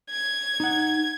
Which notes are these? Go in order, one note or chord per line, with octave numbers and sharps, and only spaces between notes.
G#6
D#4 F#5